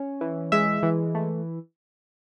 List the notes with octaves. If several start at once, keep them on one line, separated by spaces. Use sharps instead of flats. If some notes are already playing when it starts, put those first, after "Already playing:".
Already playing: C#4
E3
G#3 E5
E3
A3